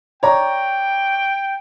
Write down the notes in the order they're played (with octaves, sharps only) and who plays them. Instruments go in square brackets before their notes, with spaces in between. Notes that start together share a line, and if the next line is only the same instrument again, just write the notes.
[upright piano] C#5 D5 A#5 [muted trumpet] G5